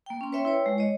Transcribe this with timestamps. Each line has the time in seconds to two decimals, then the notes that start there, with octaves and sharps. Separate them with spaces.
0.06 A#3 G5
0.21 C#4 C6
0.32 B4 C#5 E5 G5 C6
0.45 E4 B4 C#5 G5
0.66 G#3
0.78 C#5 D#5